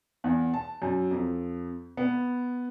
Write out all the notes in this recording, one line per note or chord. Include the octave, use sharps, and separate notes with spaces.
E2
A5
F#2
F2
B3